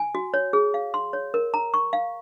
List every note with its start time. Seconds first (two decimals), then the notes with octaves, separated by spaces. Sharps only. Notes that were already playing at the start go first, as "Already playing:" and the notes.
Already playing: G#5
0.15 F#4
0.34 C#5
0.53 G#4
0.74 F5
0.94 C6
1.13 C#5
1.34 A#4
1.54 A#5
1.74 C#6
1.93 F5